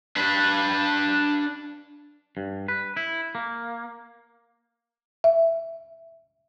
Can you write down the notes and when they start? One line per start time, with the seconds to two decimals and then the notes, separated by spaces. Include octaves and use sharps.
0.16 D4 B4
2.37 G2
2.68 B4
2.97 E4
3.35 A#3
5.24 E5